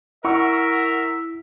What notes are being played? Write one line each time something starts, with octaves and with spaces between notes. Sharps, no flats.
E4 A#4 E5 F#5 C#6 E6